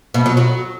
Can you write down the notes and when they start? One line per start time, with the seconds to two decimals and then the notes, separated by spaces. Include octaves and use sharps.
0.14 B2
0.26 F#3
0.37 F#3